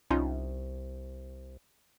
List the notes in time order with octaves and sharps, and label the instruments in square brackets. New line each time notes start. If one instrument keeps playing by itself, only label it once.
[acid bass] C2 [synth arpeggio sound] C#4 D#4 F4